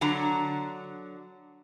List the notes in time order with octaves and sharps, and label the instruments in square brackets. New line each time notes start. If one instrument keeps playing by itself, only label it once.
[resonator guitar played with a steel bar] D3 F#3 D4 A#5